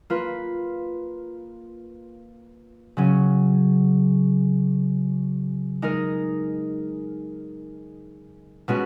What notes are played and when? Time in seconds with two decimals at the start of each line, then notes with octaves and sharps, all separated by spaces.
0.10 A#3 F4 B4
2.97 C#3 F#3 C#4
5.82 G#3 D#4 A#4
8.68 B2 G#3 C#4 F#4 B4